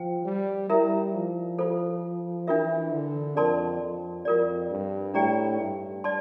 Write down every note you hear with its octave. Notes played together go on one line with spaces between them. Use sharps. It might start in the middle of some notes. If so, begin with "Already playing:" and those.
Already playing: F3 C5 G5
G3
G3 E4 A#4 E5 A#5
F3
F4 A4 C5
E3 D4 F4 A#4 E5
D3
F2 A#4 D5 A5 C6
F2
F2 F4 A#4 D5
G2
A2 D4 G4 D5 G5 A#5
G2
D5 A5 C6